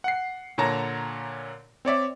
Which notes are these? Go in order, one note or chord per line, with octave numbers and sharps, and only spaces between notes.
F#5 C7
A#2 D3 C#5 A5 A#5 A#6
C4 C#5 D5 E5